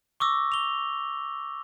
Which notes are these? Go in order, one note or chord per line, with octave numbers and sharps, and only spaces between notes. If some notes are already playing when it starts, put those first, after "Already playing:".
C#6 D6 E6 A#6
F7 G7